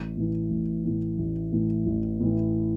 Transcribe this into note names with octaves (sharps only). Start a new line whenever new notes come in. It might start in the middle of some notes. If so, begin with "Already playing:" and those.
Already playing: A1
A2 E3
A1
A2 E3
A1
A2 E3
A1
A2 E3